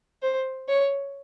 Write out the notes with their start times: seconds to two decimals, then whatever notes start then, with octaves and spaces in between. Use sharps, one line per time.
0.22 C5
0.69 C#5